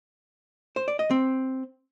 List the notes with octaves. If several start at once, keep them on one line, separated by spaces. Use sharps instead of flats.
C5
D5
D#5
C4